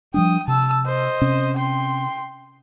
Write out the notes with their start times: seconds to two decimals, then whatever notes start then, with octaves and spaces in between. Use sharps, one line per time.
0.14 F3 G3 D4 G5 D#6
0.48 C3 A5 E6
0.86 C5 D#5
1.22 C3 C#4
1.56 G5 C6